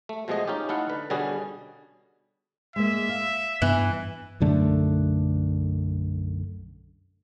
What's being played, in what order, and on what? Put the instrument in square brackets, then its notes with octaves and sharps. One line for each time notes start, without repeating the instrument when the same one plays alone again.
[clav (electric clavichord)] A3
B2 F3 G#3 A3 G#4 D#5
C#4 D#4 F4 G4
A3 D#4 E4 A4 F5 F#5
D3 B4
B2 D3 G3 B3 C#4 G#4
[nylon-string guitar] G#3 A#3 [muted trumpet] E5
[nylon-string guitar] F5
[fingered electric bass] G2 B3 [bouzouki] E3
[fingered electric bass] B1 F#2 D3 A3